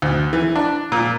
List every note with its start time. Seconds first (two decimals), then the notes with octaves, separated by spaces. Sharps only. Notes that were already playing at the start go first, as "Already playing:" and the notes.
0.02 D2
0.33 E3
0.56 D4
0.92 A#2